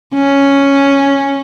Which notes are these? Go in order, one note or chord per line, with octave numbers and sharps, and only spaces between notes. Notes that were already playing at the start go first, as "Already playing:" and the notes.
C#4